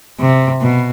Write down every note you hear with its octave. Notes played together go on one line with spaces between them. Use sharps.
C3
B2